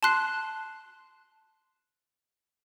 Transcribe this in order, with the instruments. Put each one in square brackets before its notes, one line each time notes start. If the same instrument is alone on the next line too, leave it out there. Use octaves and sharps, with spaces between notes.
[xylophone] A5 C6 F#6 C7